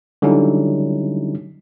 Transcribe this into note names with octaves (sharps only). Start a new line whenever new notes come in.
D3 F#3 G3 C#4 D#4 E4